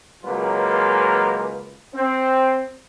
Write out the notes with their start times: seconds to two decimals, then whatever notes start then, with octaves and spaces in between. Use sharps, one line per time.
0.23 C#2 F#3 G#3 A#3 F4 B4
1.94 C4